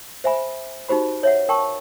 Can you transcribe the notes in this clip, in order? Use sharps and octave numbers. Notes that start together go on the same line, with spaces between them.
C5 E5 G#5 B5
D#4 F#4 G4 C5 B5
C#5 E5 F#5
A#4 G5 A5 C#6